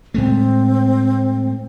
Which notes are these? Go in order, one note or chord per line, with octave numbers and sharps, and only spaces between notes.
A2 G#3 A3 C4